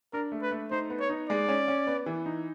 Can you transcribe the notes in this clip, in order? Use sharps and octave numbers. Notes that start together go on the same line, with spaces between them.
D4 A#4
A3
B4
A3
D#4 C5
B3
C#5
D#4
G#3 D5
C#4
C#4
B3
E3
D#4